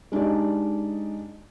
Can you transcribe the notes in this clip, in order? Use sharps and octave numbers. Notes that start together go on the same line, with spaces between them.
G#3 D4 D#4 G4 D5